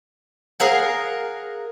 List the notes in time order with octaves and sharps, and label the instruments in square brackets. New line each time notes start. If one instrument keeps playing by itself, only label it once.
[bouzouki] G#4 A#4 F5 F#5